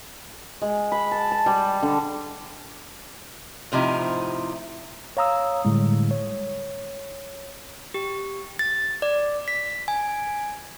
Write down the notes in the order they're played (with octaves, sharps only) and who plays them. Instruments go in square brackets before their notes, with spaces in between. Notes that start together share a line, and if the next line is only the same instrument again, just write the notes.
[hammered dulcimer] G#3
B5
A5
A5
G3
D3
[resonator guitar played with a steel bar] A2 C3 F3 D#4 E4
[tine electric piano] C#5 F5 A#5 D#6 E6
A2 D3 G3 G#3
C#5
[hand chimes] G4
A6
D5
B6
G#5